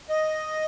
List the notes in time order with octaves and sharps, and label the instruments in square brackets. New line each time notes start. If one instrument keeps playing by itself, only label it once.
[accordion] D#5